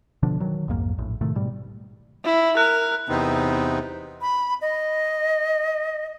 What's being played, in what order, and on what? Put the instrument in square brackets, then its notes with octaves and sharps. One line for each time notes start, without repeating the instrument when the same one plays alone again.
[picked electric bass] B2 D3 F3 D4
D#3 F#3
B1 F2 G#2 A#3
A#1 A2
A2 C3 D#3 A3
G#2 B2 G3
[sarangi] E4
[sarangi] A#4 [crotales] F#6
[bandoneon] E2 C3 B3 C4 D#4
[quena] B5
D#5